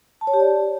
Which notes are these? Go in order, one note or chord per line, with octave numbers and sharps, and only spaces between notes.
A5
C#5
G4
D5